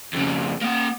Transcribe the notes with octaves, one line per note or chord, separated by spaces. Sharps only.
F2 C#3
A#3 F#5